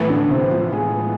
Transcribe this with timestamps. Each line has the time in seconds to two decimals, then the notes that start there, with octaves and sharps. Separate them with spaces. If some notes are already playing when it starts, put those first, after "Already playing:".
Already playing: A2 E3 B3
0.10 D3 D4
0.31 C3 C4
0.51 F3 F4
0.73 G#3 G#4